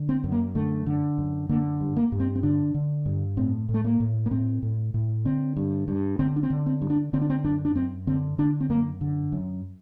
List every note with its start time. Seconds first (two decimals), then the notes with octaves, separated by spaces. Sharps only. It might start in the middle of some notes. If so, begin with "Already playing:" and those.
Already playing: D3
0.09 C4
0.24 F#2
0.32 A#3
0.55 D3 A3
0.86 D3
1.18 F#2
1.49 D3 A#3
1.80 G2
1.97 A#3
2.12 G2
2.20 C4
2.35 C4
2.43 D3 D4
2.74 D3
3.06 G2
3.37 A2 C4
3.69 A2
3.74 A3
3.85 A#3
4.00 A2
4.26 A#3
4.31 A2 C4
4.62 A2
4.94 A2
5.25 D3 C4
5.57 G2
5.88 G2
6.19 D3 C4
6.36 D4
6.43 C4
6.50 D3
6.66 C4
6.82 G2
6.90 D4
7.13 D3 C4
7.21 D4
7.30 C4
7.44 F#2 D4
7.65 D4
7.75 F#2 C4
8.07 D3 C4
8.38 D3 D4
8.60 C4
8.69 F#2 A#3
9.01 D3
9.32 F#2